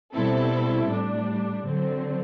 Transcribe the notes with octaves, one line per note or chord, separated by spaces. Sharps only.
B2 G3 C4 E4 A4
A2 G3 D4
D3 F#3 C4